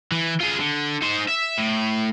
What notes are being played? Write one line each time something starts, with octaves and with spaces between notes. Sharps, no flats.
E3
F4 G#4
D3
D#4 C5
E5
A2